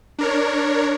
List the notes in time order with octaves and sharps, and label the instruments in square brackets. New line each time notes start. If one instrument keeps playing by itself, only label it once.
[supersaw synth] D4 A#4 C#5